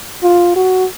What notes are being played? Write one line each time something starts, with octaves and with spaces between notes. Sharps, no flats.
F4
F#4